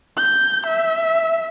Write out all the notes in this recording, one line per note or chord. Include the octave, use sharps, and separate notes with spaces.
G6
E5